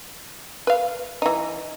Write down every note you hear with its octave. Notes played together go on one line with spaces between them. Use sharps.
B4 F5
E3 D#4